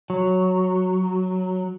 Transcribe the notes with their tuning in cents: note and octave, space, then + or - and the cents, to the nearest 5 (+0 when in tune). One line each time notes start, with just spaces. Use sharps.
F#3 +0